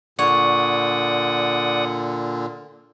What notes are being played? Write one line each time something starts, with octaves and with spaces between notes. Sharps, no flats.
A#2 D3 C#5 D5 F#5 D#6